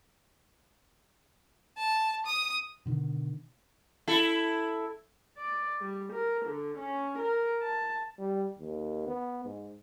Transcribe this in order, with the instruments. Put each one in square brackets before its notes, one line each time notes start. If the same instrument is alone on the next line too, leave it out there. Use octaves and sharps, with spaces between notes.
[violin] A5
D#6
[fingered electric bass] B2 D3 D#3
[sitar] E4 A4
[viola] D5
G3
A#4
D3
C#4
A#4
A5
[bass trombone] G3
D#2
B3
G#2